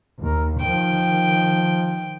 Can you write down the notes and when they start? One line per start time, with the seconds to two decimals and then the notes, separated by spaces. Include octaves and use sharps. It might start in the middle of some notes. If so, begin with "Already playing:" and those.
0.21 D#2 A#4
0.60 D#3 F3 G5